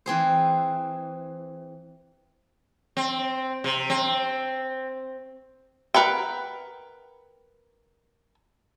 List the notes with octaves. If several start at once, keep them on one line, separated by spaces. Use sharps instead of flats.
E3 C4 G#4 C5
C4
C3
C4
A#4 B4 F#5 G5